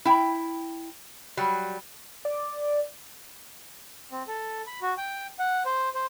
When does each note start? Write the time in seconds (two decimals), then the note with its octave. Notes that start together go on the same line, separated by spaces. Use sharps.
0.05 E4 G5
1.37 F#3 G3
2.25 D5
4.11 C4
4.27 A4
4.67 B5
4.82 F#4
4.98 G5
5.39 F#5
5.66 C5
5.95 C5